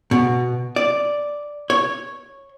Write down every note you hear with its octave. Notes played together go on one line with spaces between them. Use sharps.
B2
D5
C#5